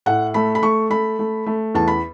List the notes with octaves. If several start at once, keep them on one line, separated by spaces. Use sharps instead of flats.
A2 F#5
A3 B5
B5
A3 C#6
A3 B5
A3
A3
E2 A5
B5